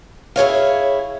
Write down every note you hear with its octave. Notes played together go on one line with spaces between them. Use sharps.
E4 G#4 C#5 F5